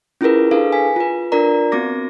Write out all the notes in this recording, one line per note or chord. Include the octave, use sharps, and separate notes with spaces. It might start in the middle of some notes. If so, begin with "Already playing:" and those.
C#4 E4 F4 G#4 A#4 B4
D4 G#4 A4 B4 F5
G#5 B6
F4 B4
D4 F4 A#4 D5 A#5
B3 C4 F#4 D6 A#6